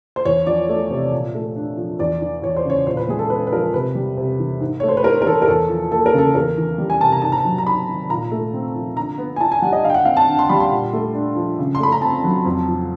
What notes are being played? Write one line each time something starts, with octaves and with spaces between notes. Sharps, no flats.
C5
E2 C#5
F3 D5
A3
C3
A#2
A3
D4
F3
E2 D5
E3
E2 C#5
C5
C#3 C#5
A#2 C5
B4
G#3 G#4
A4
B3 B4
B4
F3 A#4
C3 B4
G3
C3
E3
G#2
A3 C#5
C5
B4
G#2 A#4
A#4
E3 A4
A#4
E2 A4
F3
A#3 A4
A#4
C#3 A4
E2 A#4
E3
G3
G#5
C3 A5
A#5
G#2 A5
A#5
F#3
A#5
G#2 B5
D#3
A#2 A#5
A3
C4
F3
D3 A#5
B3
G#5
E4 A5
G#5
G3 F#5
D#5
D3 F5
G5
F#5
C4 F5
A5
D3
C6
G3 B5
C6
A#2
A3
D4
F3
C#3
C6
A3 B5
A#5
C4 A5
F#3
F2
F3